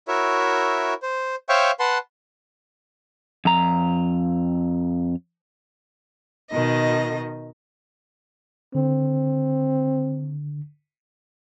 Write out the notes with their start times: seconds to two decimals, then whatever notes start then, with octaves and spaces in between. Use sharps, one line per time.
0.08 E4 F#4 A#4 C#5 E5
1.02 C5
1.49 C5 C#5 E5 F5 G5 C#6
1.80 B4 F#5 A5 C6
3.45 F2 A#5
6.51 B2 D#3 D#5
8.75 D3 C4